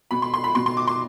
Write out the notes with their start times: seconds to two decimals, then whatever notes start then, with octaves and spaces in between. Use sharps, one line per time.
0.11 B2 B5
0.22 C6
0.34 C6
0.44 B5
0.55 B2 C6
0.66 C6
0.77 D6
0.87 C6